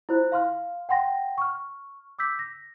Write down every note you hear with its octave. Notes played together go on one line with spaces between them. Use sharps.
E4 F4 C5 F#6
F5 C6 F6
F#5 G5 C6 A#6
C#6 F6
D6 E6 G6 B6
A#6